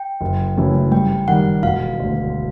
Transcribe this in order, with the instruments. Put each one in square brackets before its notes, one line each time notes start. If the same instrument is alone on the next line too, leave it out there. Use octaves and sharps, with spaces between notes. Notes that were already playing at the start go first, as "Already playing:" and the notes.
Already playing: [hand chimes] G5
[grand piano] F#1
F#2 C#3 E3 A3
[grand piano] G2 [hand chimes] G5
[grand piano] D#3 G3 [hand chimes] F#5
[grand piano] E1 [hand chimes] F5
[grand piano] D2 D3